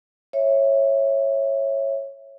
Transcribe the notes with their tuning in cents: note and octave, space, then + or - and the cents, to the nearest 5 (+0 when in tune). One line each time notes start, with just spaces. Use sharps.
C#5 -15 E5 -5